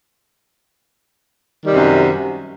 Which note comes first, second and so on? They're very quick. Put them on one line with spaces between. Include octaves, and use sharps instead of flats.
D#3 G3 C3 F#2